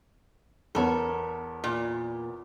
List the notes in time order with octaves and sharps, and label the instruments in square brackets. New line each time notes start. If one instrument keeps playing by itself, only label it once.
[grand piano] E2 B3 C#5 [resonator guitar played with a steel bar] A4 A#4
[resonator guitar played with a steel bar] A#2